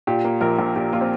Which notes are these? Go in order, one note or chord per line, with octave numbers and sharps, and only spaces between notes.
A#2 G4
A#3
A#1 A#4
A#1
A#2 G4
A#3 F4
C4